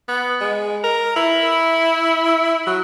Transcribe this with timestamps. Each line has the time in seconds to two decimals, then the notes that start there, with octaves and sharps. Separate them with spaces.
0.08 B3
0.41 G#3
0.84 A#4
1.16 E4
2.67 F#3